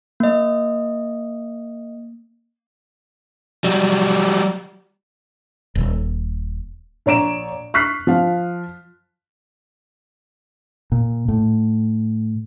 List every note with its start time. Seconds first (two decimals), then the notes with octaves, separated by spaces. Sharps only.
0.20 A#3 D#5
3.64 F#3 G3
5.75 D#1
7.06 A#1 C#5 A#5 D7 E7
7.74 C#6 F6 F#6 B6 C7
8.07 F3 F5
10.92 A#2
11.28 A2